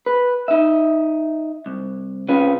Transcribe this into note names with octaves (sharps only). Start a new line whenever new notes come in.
B4
D#4 E5
C2
C3 C#4 F4 B4